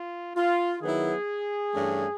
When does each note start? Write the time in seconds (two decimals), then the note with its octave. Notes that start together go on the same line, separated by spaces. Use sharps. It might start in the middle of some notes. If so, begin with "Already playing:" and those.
Already playing: F4
0.36 F4
0.81 D#3 F#3 B3 E4 G#4
1.73 G2 E3 A3 C#4